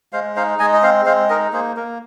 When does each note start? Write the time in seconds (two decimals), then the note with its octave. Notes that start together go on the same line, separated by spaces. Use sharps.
0.13 G#3 C5 F5
0.36 D#4 C5 F5
0.59 G#3 D#5 G#5
0.73 D#5
0.83 C4 C5 F5
1.06 G#3 C5 F5
1.29 D#4 A#4 D#5
1.53 A#3 G#4 C5
1.76 A#3 A#4